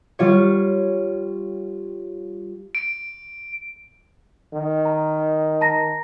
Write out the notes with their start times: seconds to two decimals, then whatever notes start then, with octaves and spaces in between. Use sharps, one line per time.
0.19 G3 F4 C#5
2.75 D7
4.53 D#3
4.85 A#5
5.61 A5 A#5 A#6